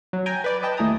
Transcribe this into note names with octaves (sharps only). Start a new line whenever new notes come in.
F#3
G5 G#5 A#5
B4 D5
B4 D#5 G5 A5
D#2 A3 E4 G#4 A#5 D#6